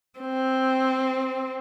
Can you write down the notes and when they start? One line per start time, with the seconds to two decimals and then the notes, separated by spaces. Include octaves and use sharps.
0.20 C4